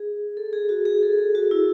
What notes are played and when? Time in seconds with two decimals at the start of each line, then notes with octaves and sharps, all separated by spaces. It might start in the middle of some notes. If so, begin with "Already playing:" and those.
Already playing: G#4
0.37 A4
0.53 G#4
0.69 F#4
0.85 G#4
1.03 A4
1.18 A4
1.35 F#4
1.51 E4